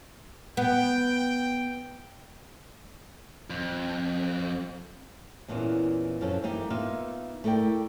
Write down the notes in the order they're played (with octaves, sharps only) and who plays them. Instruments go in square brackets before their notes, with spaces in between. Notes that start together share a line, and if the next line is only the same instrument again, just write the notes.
[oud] B3 [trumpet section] G5
[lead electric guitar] F2
[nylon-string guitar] E2 A#2 E3 B3 C#4
F#2 F3 F#3 B3 C#4 A4
E3 A#3 D#4 G4
A#3 B3 D#4 F4 E5 F5
A3 E4 A#4 D5 G5